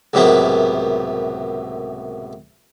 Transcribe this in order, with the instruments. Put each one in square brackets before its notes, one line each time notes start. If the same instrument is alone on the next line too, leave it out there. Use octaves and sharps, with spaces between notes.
[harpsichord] C#2 F#2 A2 C3 A#3 B3